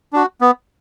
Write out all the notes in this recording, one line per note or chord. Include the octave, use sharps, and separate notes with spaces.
D4 F#4
B3